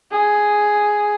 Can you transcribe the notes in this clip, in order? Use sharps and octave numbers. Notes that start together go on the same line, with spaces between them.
G#4